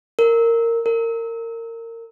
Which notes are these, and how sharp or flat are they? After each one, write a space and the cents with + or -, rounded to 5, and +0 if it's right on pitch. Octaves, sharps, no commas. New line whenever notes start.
A#4 -15
A#4 -25